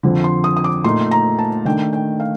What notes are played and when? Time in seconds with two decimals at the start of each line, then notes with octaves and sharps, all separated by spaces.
0.03 F2 D3 F3
0.24 C6
0.44 D#6
0.57 D#6
0.64 D6
0.84 A#2 A3 D#4 C6
1.11 A#5
1.39 A5
1.65 D#3 A3 D4 G5
1.93 G5
2.20 F5